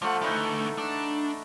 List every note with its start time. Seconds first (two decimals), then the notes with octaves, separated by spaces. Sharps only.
0.02 F3 G3 A3 F#5
0.22 D3 E3 A3 D#4 F#5
0.78 D4